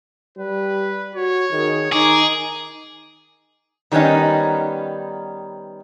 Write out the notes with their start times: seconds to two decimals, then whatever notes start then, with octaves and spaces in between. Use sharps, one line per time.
0.37 G3 B4
1.15 F#4 C#5
1.52 D#3 G#4
1.92 D#3 D#4 G#4 D6
3.92 D#3 G3 B3 C#4 D#4